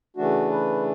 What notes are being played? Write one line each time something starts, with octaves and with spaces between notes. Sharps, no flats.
C#3 E3 A3 D4 F#4
B4